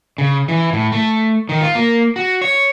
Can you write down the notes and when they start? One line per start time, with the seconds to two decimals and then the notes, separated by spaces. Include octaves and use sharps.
0.18 C#3
0.48 E3
0.73 A2
0.92 A3
1.49 D#3
1.61 F4
1.75 A#3
2.16 F#4
2.42 C#5